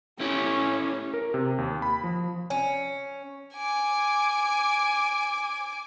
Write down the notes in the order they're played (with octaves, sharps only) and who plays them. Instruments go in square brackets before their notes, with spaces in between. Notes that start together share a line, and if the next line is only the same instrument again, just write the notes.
[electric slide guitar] A3 E4 G4 [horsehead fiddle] C#4
[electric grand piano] A#4
C3
D#2
B5
F3
[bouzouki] C#4
[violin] G#5 D6